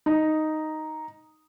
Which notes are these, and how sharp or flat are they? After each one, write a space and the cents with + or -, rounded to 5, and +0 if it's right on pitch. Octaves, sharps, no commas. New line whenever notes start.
D#4 +0